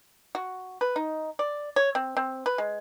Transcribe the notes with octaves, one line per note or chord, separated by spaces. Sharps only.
F#4
B4
D#4
D5
C#5
C4
C4
B4
G#3